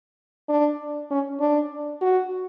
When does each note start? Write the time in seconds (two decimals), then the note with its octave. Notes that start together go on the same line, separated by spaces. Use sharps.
0.49 D4
1.11 C#4
1.40 D4
2.02 F#4